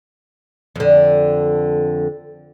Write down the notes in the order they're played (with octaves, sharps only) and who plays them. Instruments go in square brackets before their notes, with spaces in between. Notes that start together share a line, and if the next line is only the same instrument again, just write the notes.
[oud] F2 D3